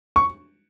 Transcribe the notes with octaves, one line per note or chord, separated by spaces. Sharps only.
C#6